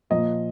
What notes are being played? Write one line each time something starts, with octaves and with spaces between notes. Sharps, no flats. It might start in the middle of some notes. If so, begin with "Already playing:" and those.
A#2 F3 A#3 D#5